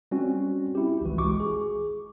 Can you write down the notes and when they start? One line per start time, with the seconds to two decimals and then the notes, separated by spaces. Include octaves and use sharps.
0.11 G3 C4 C#4 F#4
0.75 E4 G4
1.01 G#1 C#2 E3 F#4
1.18 G#3 C#6 D6
1.40 G#4